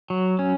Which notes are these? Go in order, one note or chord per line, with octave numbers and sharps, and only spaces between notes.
F#3
C#4